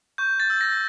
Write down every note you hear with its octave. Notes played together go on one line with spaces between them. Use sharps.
C#6 G6
A6
E6 G6
A#6